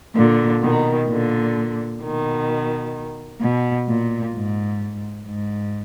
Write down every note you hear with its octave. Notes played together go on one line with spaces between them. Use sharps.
A#2 D3
B2 D#3
A#2 D3
B2 D#3
B2
A#2
G#2
G#2